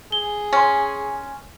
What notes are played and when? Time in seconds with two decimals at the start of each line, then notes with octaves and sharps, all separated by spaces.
0.12 G#4 G7
0.53 C#4 G#5 C6